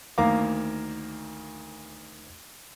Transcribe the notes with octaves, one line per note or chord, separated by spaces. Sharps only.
D2 D#3 A#3 F5 A#5 D6